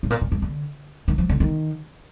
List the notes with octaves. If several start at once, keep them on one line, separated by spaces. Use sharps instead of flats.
A2
A#2
A#2
G2
D3
D#3
F3
D3
D#3